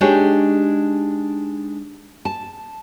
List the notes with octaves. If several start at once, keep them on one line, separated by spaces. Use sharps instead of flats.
G#3 D4 D#4 G4 C#5
A5